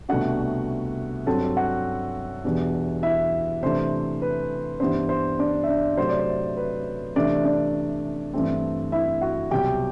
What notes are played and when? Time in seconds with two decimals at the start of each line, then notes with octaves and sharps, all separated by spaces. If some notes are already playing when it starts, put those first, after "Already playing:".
0.09 C2 B2 A3 D4 F#4 F#5
1.26 G2 F#3 C4 A4 A5
1.56 F#4 F#5
2.44 E2 B2 G3 D4
3.03 E4 E5
3.63 C3 E3 A3 D4 C5
4.22 B4
4.80 G2 E3 G3 B3 D4 C5
5.09 C5
5.39 D4 D5
5.63 E5
5.68 D4 D5
5.97 C3 F#3 A3 C5
6.09 D5
6.19 C5
6.57 B4
7.15 C3 E3 A3 D4 D5
7.45 D4 D5
8.34 G2 E3 A3 C4
8.92 E4 E5
9.21 F#4 F#5
9.51 C2 B2 F#3 G4 G5